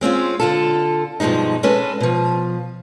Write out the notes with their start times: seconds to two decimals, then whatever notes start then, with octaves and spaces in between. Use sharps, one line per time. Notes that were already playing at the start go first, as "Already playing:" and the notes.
0.01 G#3 C4 C#4 F4
0.40 D3 F4 A4
1.20 G2 B2 F3 G#3 D#4
1.63 G#3 C#4 A4 B4
2.00 B2 F3